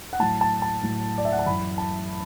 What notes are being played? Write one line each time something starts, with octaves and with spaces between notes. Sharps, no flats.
F#5
A2 F#3 A5
A5
A5
A2 F#3
D5
E5
F#5
A5
F#2 E3 B5
A5